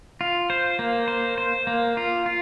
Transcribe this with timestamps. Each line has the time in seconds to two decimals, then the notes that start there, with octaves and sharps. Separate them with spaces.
0.21 F4
0.50 C5
0.79 A#3
1.08 C5
1.38 C5
1.67 A#3
1.97 F4
2.26 F4